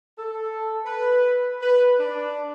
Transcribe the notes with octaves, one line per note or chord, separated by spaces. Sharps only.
A4
B4
B4
D4